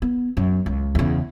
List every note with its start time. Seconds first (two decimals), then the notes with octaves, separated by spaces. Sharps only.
0.02 B3
0.37 F#2
0.66 C#2
0.95 E2 C#3